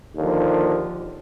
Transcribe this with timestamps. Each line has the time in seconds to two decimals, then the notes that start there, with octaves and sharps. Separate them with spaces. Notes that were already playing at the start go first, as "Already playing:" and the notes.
0.16 D#2 D3 F3